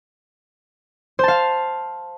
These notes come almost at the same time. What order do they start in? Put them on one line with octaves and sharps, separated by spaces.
C5 A5 F5